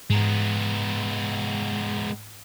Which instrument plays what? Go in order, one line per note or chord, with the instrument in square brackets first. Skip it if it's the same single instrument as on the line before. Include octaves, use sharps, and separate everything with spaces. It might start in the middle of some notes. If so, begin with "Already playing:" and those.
[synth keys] G#2 A#5 [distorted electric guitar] G#3 B3